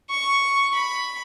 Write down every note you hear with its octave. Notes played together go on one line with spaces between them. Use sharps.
C#6
B5